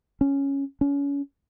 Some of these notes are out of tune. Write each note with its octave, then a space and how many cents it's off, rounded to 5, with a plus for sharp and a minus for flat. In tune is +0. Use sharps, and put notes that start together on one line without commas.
C#4 +0
C#4 +30